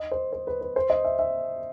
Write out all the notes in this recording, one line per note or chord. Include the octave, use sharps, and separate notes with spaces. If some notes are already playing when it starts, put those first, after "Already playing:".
Already playing: D#5
C5
C5
B4
B4
C5
D#5
E5
E5